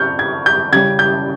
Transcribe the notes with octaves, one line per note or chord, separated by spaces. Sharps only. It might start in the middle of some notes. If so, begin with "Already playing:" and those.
Already playing: C#3 C4 C#6 F6 G6
G#6
G6
C#3 G3 C#4 G#6
G6